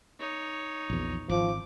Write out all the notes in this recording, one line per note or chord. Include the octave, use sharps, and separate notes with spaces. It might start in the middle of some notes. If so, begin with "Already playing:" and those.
D#4 C#5
A#1 E2
G#1 F3 D6